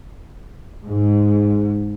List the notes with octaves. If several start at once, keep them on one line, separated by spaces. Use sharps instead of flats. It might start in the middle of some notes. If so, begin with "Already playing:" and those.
G#2